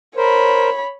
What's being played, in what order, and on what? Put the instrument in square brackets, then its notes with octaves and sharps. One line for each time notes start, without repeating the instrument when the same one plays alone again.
[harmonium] A#4 C5 [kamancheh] C#5 B5